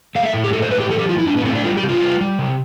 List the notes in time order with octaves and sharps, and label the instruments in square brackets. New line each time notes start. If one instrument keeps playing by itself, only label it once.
[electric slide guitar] A3 F5
E5
A2
G4
A3 A4
C5
A2 B4
G4
F3 A4
G4
A2 F4
E4
A2 D4
B3
A3 C4
D4
G3 F4
G4
C3
F4
G3
G3
C3